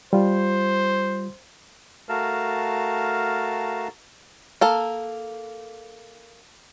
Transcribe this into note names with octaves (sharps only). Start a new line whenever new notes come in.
G3 F4 C5
A3 F#4 A#4 F5 A5
A#3 A4 F5